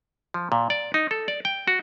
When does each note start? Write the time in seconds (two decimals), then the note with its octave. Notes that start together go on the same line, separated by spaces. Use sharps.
0.34 F3
0.52 A#2
0.70 D5
0.94 D#4
1.11 A4
1.28 D5
1.45 G5
1.68 F#4